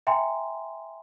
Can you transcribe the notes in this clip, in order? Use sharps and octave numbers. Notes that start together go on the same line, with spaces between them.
E5 G5 G#5 A#5 C6